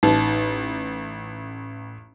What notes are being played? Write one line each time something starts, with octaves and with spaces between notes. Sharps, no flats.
A1 D#4